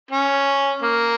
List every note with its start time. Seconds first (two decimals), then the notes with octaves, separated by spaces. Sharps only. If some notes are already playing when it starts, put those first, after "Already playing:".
0.11 C#4
0.82 A#3